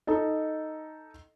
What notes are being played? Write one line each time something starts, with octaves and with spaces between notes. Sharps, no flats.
D#4 A4 D#5